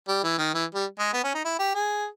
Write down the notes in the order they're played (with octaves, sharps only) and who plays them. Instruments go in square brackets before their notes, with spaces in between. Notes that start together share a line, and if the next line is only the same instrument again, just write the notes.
[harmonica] G3
E3
D#3
E3
G3
G#3
B3
C#4
D#4
E4
G4
G#4